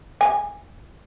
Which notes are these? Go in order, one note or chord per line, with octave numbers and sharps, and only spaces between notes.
G#5